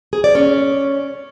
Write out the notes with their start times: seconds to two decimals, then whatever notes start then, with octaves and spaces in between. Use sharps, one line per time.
0.13 G#4
0.24 D5
0.35 C#4